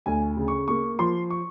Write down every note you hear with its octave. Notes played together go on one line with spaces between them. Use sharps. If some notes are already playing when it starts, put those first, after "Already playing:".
D2 G#5
C#3
C#6
A#3 C#6
F3 C6
C#6